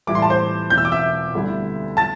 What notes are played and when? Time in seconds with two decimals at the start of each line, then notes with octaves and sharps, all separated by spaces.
0.07 A2 E3 G3 E4 D6
0.15 C6
0.22 A5
0.30 C5 C6
0.70 E1 E2 E3 G6
0.78 E6
0.85 D6
0.92 E5 E6
1.34 D2 D3 G3 E4
1.97 A5 A6